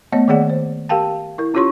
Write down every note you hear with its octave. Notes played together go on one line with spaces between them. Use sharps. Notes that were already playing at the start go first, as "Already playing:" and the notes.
A3 B3 C#5 D#5
D#3 A#3 G#4 C#5 D5 F#5
C5
G4 A#4 F5 G5 A5
E4 A#4
C#4 F4 G4 C#5 C6 C#6